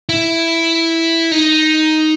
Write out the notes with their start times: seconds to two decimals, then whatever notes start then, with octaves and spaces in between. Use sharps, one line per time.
0.09 E4
1.31 D#4